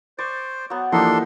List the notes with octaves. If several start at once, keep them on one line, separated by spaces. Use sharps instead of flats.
C5 D5 C#6
F#3 B3
E3 F3 A#3 D4 D#4 G4 A4 C6